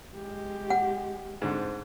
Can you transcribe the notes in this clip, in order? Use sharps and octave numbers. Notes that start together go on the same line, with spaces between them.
G#3 G4
F#5
G#2 D3 C4